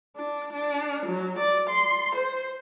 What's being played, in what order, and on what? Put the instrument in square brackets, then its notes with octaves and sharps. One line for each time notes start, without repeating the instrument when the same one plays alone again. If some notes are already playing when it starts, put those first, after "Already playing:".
[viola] D4
D4
F#3
D5
C6
C5